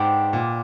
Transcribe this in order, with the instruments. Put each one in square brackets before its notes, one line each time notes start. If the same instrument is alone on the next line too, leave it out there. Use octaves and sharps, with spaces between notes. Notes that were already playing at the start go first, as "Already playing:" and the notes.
Already playing: [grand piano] G#2 [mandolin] B3 D4 G4 C5
[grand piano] A#2